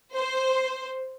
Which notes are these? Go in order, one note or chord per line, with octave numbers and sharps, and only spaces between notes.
C5